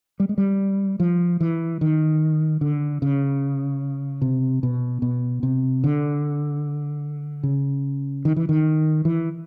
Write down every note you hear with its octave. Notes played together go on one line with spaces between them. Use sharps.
G3
G#3
G3
F3
E3
D#3
D3
C#3
C3
B2
B2
C3
D3
C#3
D#3
E3
D#3
E3